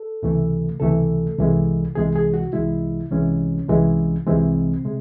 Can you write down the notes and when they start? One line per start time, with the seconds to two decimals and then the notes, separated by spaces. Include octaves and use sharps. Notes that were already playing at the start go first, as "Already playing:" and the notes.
Already playing: A4
0.23 C#2 C3 E3 A3
0.80 C#2 C3 E3 A3 A4
1.38 C2 C3 E3 G#3
1.95 C2 C3 E3 G#3 G#4
2.16 G#4
2.34 F#4
2.53 C2 C3 E3 G#3 E4
3.11 C2 C3 E3 G#3 C#4
3.69 C2 C3 E3 G#3
4.26 C2 C3 E3 G#3 C4
4.85 C3 G#3